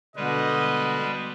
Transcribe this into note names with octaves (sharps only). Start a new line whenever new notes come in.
B2 D3 G3 G#3 B4 D#5